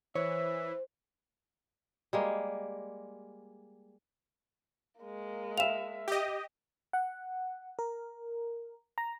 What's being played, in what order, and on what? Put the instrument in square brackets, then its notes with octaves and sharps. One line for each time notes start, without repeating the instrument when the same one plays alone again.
[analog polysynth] E3 [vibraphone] C5 [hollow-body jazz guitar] C#5 [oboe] E5
[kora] G3 G#3 A#3
[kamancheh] G#3 A#3
[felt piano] E5 F5 [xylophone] E7 F7
[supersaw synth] G4 D#5
[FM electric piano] F#5
A#4
A#5